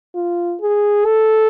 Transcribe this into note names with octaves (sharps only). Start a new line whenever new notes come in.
F4
G#4
A4